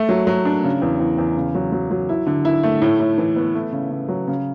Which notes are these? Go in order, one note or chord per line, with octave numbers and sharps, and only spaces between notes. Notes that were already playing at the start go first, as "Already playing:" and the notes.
Already playing: A3
F#3
F#3
D4
C#3
E2
E2
E2
C#3
F#3
F#3
F#3
E4
D3
E4
A3
A2
A2
E3
B3
A3
C#3
C#3
F#3
C#3